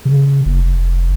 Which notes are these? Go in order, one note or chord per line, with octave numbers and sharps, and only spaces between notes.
C#3
F1